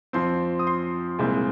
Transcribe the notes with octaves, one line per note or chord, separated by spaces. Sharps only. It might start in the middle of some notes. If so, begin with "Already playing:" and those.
F2 F3 C4 C6
D#6
C6
C2 A#2 G#3 C4